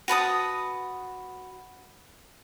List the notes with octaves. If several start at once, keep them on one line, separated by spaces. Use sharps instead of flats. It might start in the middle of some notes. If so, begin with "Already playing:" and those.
F#4 B4 A5 D#6